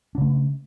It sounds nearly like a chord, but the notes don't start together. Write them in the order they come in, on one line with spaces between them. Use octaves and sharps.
D4 C#3 A3